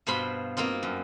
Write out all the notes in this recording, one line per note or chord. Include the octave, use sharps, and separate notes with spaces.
G2 B2 F4 C5 B5 C6
A#3 C4 D#4 F4
F#2